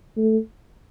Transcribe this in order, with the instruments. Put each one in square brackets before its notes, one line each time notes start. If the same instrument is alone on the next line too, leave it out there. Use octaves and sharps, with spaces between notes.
[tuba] A3